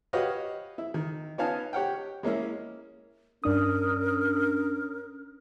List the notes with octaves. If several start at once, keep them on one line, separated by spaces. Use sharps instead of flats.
F#4 G4 B4 C#5 D#5 F5
E4
D#3
B3 C#4 D#4 F5 G#5 A5
G4 C#5 F#5 G5
G#3 A#3 C#4 E4
G2 C#4 D4 A#4 D#6